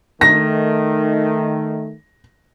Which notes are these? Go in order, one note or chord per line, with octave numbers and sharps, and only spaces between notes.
D#3 A3 A#6